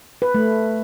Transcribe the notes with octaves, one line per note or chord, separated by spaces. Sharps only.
B4
A3